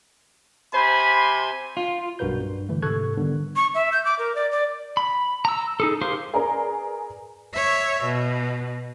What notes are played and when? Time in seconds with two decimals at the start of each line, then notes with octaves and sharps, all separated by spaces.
0.73 C3 C5 G#5 B5
1.77 F4
2.19 B1 G2 F#4 A#4 B4 G6
2.42 G2
2.69 D3 E3 A3
2.82 G#2 C3 A4 C#6 F#6 G#6
3.17 D3 D#3 G3 B3
3.56 C#6
3.75 E5
3.92 G6
4.05 D6
4.19 A#4
4.35 D5
4.52 D5
4.97 B5
5.45 A#5 E6
5.80 D#4 G#4 A4
6.01 G4 G#4 A#4 C5 F5
6.34 G#4 A#4 B4 D5 A#5
7.54 C#5 E5
8.04 B2